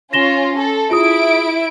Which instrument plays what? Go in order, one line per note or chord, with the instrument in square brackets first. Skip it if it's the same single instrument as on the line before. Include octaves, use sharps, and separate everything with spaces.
[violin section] C#4 F4 [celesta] A#6 E7 G7
[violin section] A4
[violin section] E4 D7 [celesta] F4 G#4 D#6